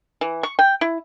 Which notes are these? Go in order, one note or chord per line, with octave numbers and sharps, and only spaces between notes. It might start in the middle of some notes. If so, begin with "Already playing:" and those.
E3
C#6
G5
E4